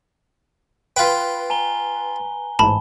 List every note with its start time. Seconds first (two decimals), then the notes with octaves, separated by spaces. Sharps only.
0.96 F4 B4 G5
1.50 G#5 A#5 G7
2.59 A1 G#2 A5 B5